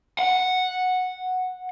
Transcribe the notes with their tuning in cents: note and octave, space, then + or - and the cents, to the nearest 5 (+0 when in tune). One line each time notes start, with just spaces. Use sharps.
F#5 -5